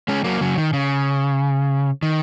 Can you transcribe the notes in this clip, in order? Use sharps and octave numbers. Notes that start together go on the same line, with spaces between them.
G#3 C#4
F#3 A#3
C#3 F#3
D#3
C#3
D#3